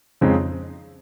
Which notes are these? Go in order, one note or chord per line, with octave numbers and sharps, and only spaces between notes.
F2 C#3 G#3 C4 D#4